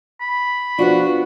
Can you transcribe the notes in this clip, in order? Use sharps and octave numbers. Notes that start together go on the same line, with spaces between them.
B5
F3 B3 D4 F#4